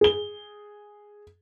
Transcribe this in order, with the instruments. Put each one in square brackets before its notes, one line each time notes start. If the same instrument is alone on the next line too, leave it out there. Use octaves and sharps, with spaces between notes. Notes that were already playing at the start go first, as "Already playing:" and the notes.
[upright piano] G#4 G7